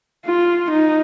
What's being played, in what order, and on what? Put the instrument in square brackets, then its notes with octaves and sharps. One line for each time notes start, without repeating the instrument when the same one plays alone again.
[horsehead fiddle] F4
D#4